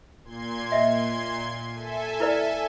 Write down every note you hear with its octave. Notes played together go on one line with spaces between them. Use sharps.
A#2 C6 G#6
D#5 E5
A4 E5 G#5
E4 B4 D5